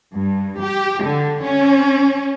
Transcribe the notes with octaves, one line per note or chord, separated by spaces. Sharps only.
G2
G4
D3
C#4